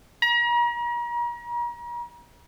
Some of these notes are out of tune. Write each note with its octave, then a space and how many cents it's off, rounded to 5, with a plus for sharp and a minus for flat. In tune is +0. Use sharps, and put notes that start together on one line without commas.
A#5 +40